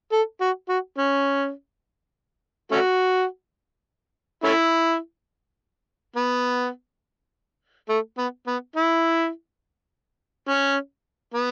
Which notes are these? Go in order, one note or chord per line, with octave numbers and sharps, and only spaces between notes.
A4
F#4
F#4
C#4
A3 C#4 F#4
A3 C#4 E4
B3
A3
B3
B3
E4
C#4
B3